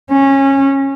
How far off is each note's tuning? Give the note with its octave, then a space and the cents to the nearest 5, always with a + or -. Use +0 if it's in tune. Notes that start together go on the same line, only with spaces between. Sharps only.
C#4 -20